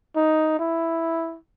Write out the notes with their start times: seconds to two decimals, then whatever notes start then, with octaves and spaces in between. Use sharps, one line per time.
0.16 D#4
0.59 E4